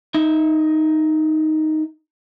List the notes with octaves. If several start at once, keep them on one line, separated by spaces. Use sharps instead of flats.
D#4 E5